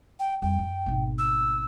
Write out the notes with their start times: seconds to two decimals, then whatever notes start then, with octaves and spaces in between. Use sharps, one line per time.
0.20 G5
0.42 F2 G3 G5
0.59 F#2
0.86 G#1 B2
1.18 E6